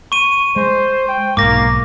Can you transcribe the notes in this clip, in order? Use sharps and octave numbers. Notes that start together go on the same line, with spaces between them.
C#6 D#7
G#3 C5
G5
B1 G#2 A#3 D6 A#6